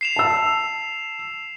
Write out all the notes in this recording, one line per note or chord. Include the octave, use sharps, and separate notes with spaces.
C7 E7 F7
A5 E6